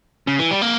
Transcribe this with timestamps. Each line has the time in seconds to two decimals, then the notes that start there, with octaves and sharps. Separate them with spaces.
0.27 C#3
0.39 E3
0.51 G3
0.62 A#3